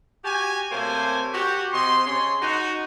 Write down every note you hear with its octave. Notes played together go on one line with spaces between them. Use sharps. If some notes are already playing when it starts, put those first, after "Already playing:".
F#4 G4 G#5
C3 A3 A#3 C5 C#5 G#5
F#4 G4 F#5
C3 C4 D#5 C6
C#3 G#4 C#5 C6
D#4 F#4